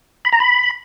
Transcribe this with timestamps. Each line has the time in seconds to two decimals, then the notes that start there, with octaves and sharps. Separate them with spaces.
0.25 B5
0.32 A#5
0.40 B5